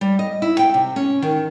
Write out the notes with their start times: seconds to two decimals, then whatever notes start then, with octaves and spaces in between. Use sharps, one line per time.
0.01 G3
0.19 D#5
0.42 E4
0.59 G5
0.74 C3
0.96 C#4
1.22 D#3